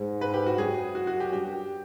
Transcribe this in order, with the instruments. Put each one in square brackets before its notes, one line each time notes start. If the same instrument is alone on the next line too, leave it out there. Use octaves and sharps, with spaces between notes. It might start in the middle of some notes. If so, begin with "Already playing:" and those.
Already playing: [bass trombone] G#2
[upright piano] B4
G4
F#4
[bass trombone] F#2 [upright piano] G#4
[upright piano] F#4
F#4
G4
[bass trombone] G2 [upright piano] G4